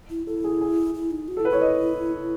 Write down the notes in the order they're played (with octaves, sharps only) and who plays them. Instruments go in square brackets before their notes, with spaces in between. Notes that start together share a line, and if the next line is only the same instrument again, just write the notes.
[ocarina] E4
[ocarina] E4 [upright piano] A4
[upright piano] G#4
G#4
[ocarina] E4
D#4
F#4
[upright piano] A4
[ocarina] E4
[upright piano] B4
[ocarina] E4 [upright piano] C#5
[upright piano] D#5